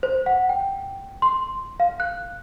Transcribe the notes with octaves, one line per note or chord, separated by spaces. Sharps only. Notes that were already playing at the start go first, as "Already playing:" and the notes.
C5
F#5
G5
C6
F5
F#6